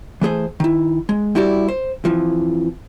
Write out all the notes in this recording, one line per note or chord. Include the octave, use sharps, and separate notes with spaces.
E3 A3 G#4 C5
D#3 E4
G#3
G3 E4 F#4 G4 D5
C5
F2 E3 F3